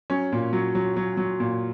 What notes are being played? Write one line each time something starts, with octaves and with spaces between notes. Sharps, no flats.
F#3 C#4
A#2
F#3
F#3
F#3
F#3
A#2